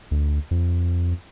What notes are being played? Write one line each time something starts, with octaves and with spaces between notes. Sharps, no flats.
D2
F2